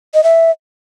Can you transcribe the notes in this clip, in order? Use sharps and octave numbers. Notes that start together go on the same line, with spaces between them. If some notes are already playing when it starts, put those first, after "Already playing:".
D#5
E5